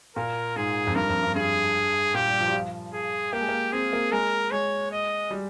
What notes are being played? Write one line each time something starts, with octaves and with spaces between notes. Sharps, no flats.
A#2 A#4
G#2 G#4
F2
G2 A#4
F2
G2
G2 G#4
A#2 G4
G3
F3
G3
F3
G#4
A#3 G4
G#3
A#3
C4 G#4
A#3
G#3 A#4
G#3 C#5
D#5
G3